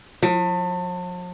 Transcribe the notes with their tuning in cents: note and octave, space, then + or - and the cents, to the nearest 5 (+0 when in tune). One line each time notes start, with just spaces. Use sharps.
F3 +45